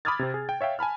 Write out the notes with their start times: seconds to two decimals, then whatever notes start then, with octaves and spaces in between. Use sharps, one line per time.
0.05 B5 D6 D#6 F6 G#6 A6
0.19 C3 C4
0.34 G#4
0.49 G5
0.61 C#5 E5 F5 G5
0.79 G#5 A5 B5 F6